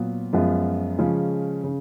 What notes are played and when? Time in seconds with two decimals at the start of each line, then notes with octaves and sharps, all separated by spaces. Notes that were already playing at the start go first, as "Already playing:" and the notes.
Already playing: A#2 F#3 B3 F4
0.33 F#2 F3 G#3 B3 F4
0.98 C#3 F3 G#3 C#4
1.64 C#3